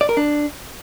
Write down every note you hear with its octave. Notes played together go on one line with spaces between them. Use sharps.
D5
A#4
D4